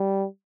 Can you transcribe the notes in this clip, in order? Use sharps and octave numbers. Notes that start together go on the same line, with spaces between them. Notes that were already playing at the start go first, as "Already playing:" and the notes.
Already playing: G3